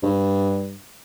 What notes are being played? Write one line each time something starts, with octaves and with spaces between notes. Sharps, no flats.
G2